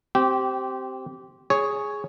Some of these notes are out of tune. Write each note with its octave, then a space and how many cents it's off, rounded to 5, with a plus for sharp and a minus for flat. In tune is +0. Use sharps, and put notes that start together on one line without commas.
C4 +0 G4 -20
G#4 +0 C#5 +0